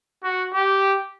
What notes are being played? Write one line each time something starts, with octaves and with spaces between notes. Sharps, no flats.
F#4
G4